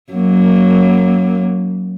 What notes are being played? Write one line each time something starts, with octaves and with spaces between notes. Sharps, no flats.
F#2 F#3 A#3